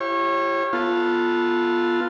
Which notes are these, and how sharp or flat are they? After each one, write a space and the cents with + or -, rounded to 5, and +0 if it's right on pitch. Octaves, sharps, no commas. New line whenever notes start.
E4 +45 G4 +0 C#5 -25
B3 -15 F4 +0 A4 +0